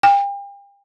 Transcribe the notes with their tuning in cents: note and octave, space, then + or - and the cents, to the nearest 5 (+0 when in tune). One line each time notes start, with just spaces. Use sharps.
G5 +40